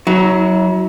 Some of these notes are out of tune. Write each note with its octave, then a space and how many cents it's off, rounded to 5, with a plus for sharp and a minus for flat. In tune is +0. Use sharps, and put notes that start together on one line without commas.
F#3 +10 E4 -35